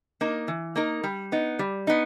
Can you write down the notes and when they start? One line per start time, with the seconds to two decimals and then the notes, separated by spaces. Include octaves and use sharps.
0.21 A#3 D#4 A#4
0.48 E3
0.76 A#3 D#4 A#4
1.04 G3
1.32 B3 D#4
1.59 G3
1.87 B3 D#4